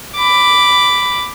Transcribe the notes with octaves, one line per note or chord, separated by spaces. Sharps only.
B5 D6